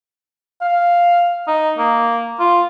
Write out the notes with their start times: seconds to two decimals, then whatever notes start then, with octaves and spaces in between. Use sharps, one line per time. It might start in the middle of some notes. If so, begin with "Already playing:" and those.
0.61 F5
1.48 D#4
1.78 A#3
2.40 F4